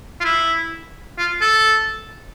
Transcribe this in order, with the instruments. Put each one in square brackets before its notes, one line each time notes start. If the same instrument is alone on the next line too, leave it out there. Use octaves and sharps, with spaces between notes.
[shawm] F4
E4
F4
A4